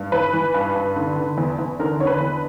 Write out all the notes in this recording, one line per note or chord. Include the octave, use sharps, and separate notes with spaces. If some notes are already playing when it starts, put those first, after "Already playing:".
Already playing: G2
E3 B4
E3
G2
G2
D3
D3
E2
E2
D3 A#4
D3 C#5
B4
E2